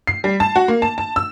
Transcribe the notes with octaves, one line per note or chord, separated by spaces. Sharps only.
C7
G3
A5
F#4
A#3
A5
A5
E6